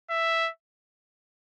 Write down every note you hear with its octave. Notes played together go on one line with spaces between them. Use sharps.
E5